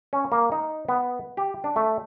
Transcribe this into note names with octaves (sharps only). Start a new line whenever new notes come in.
C#4
A#3
D#4
B3
G4
D4
A3